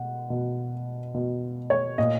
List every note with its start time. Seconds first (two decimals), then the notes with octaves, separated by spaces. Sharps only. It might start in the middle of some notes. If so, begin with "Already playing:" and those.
Already playing: B2 F#5
0.30 B2
1.14 B2
1.70 C#5
1.98 A#2 D#5